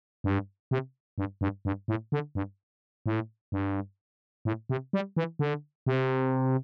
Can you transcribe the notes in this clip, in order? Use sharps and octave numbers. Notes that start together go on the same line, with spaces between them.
G2
C3
G2
G2
G2
A2
D3
G2
A2
G2
A2
C3
G3
E3
D3
C3